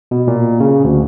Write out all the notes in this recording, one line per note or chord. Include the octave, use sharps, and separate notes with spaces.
B2
A#2
C#3
D2